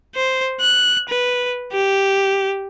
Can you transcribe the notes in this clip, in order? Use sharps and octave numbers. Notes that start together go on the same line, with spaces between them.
C5
F#6
B4
G4